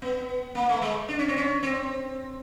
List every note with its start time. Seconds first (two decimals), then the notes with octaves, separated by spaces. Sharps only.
0.02 B3
0.55 A#3
0.69 A3
0.81 G#3
1.08 D4
1.19 C#4
1.28 C4
1.37 C#4
1.63 C4